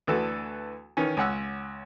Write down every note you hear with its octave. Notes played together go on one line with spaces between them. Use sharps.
D2 E3 F#4 A4
D#3 E3 C#4
C#2 C#4 F#5 E6